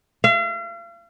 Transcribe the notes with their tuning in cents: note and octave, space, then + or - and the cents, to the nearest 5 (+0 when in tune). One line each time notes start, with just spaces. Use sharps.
F5 -40